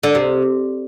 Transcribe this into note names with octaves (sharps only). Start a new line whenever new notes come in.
D3
C3